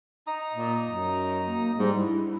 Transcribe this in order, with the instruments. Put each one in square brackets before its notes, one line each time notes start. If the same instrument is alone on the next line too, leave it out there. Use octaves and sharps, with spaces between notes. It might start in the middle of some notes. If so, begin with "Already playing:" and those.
[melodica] D#4 A#5 D#6
[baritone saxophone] A#2
F#2
[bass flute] A#3
[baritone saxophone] G#2 [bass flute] G3
[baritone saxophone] G2 [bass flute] E4